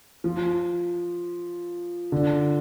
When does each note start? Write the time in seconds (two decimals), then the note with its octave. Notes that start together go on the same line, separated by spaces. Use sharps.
0.24 F3
2.12 D3